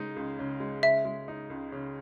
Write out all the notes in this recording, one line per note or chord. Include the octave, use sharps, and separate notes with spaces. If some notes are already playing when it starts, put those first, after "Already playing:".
Already playing: C#3 G#3 D#4
C#2
C#3
G#3
C#3 E5
G#3
D#4
C#2
C#3